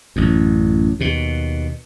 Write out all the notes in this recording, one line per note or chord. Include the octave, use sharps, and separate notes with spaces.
A1 F#2
D#2 B2